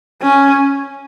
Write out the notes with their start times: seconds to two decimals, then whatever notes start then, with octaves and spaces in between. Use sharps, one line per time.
0.22 C#4